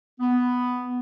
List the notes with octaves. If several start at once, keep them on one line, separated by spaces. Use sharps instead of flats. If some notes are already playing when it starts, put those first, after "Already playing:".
B3